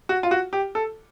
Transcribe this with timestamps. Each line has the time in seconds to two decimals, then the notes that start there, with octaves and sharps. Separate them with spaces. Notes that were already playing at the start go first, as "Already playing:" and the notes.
0.09 F#4
0.23 F4
0.31 F#4
0.53 G4
0.75 A4